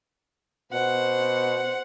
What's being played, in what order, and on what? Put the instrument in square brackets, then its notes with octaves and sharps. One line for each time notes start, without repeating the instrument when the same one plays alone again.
[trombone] B2 [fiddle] C5 F#5